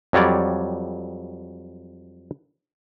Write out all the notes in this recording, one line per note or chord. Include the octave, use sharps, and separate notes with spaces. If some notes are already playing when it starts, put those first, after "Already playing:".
F2 F#3 G3 C#5 D5